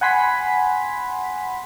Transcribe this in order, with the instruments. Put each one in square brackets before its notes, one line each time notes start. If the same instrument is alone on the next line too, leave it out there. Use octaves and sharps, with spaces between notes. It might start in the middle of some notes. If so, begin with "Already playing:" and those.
[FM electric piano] F#5 G#5 B5 C6 B6